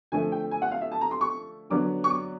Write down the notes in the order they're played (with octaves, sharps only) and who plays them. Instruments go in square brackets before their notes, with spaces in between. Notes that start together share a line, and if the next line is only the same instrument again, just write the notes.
[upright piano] D3 F3 A3 G#5
G5
G#5
F#5
F5
E5
A5
A#5
C6
C#6
D3 F#3 B3 D4 D6
C#6
D6